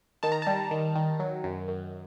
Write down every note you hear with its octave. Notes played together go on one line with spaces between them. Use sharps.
D#3 A5
A#5
G3 A5
D#3
D#3
F#3
F#2
F#2